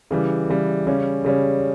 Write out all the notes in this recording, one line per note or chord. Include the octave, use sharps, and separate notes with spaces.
C#3 E3 G3
C#3 E3 G3
C#3 G3 C#4
C#3 G3 C#4